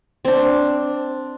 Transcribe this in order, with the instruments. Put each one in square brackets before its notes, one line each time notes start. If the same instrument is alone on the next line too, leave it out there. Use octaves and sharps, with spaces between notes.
[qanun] C4 D4